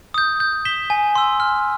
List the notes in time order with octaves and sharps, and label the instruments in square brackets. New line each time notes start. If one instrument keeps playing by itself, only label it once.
[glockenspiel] D#6 G6
G6
B6 E7 G7
G#5
C6 E6
F6